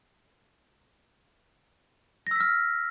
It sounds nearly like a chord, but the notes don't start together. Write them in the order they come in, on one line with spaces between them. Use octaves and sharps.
A#6 E6 B6 F6